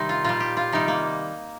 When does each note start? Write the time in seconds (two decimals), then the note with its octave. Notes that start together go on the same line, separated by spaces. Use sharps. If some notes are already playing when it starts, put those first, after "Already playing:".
Already playing: C3 D#3 G3 C4 D#4
0.09 F4
0.24 A#2 G3 F4
0.40 G4
0.57 F4
0.72 C3 D#3 G3 D#4
0.88 A#3